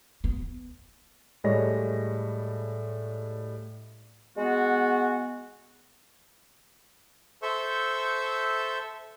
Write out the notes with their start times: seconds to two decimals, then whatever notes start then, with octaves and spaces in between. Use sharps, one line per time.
0.24 B3
1.44 A2 G3 G#3 C#5 D#5 A#6
4.37 G#3 B3 F#4
7.42 A4 C5 E5 C#6 E6 G6